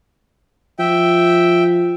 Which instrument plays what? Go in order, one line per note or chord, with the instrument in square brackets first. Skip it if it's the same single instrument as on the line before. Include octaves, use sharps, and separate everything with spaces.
[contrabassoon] F3 [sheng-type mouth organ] E5 G5